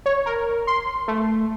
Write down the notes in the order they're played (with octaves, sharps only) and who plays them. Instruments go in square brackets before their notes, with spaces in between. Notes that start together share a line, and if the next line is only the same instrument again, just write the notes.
[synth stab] C#5
A#4
C6
A3